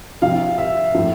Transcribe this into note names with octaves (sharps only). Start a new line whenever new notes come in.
C3 F3 F5
E5
A2 F3